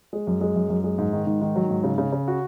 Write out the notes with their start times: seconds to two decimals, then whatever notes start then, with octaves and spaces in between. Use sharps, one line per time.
0.13 G#3
0.27 F#2
0.41 G#3
0.56 F#2
0.69 F#2
0.84 G#3
0.98 G#2
1.13 D#3
1.27 G#2
1.42 D#3
1.56 F#3
1.71 G#2
1.84 C#3
1.98 C#3
2.13 C#3
2.28 F#4